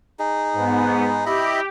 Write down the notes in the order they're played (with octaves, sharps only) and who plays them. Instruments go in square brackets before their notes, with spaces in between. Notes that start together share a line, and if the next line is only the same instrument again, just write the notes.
[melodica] D#4 G#4
[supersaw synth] G#2 B3
[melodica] E4 D#5 B5 [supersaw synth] G4